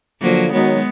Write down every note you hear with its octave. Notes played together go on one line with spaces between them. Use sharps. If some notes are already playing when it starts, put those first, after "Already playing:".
D3 F3 F#3 A#3
D#3 F#3 G#3 B3